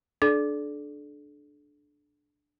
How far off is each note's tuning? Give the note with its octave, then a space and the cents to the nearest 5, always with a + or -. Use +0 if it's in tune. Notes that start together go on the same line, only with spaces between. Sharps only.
D4 +5 A4 -40 D5 +0